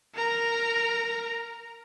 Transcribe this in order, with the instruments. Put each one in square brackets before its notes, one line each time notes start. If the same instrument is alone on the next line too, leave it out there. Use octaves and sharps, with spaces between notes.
[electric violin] A#4 A#5